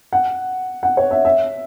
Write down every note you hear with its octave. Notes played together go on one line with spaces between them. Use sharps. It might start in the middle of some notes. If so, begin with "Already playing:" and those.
F#5
F#5
C#5
E5
E5